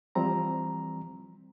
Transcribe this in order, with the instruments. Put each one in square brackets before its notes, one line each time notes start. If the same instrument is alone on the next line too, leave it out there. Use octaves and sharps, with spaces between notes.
[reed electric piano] E3 F3 G3 C4 A#5